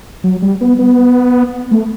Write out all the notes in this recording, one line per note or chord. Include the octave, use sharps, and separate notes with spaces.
F#3
G3
B3
B3
A3